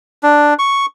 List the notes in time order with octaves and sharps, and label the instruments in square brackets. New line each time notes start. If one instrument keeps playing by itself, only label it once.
[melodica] D4
C#6